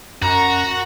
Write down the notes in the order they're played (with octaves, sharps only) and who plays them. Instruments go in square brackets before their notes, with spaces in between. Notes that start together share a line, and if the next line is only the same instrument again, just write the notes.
[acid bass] F#2 [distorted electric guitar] F#4 [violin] A#5